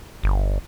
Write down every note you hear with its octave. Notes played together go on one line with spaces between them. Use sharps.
G1